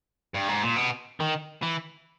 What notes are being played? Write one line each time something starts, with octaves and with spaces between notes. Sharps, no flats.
G2
G#2
A#2
B2
D#3
E3